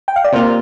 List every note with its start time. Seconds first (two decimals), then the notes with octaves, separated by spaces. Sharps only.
0.08 G5
0.16 F5
0.24 D5
0.32 C3 A#3 F4 C5